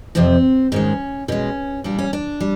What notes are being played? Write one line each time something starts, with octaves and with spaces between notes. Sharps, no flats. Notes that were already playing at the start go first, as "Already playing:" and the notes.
F2 C3 F3 C4
G#2 D#3 G#3 C#4
B2 G#3 C#4
A#2 G3 D4
C#4
D4
G3